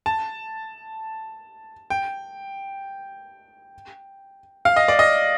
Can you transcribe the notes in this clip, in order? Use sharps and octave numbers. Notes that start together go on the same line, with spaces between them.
A5
G5
F5
D#5
D5
D#5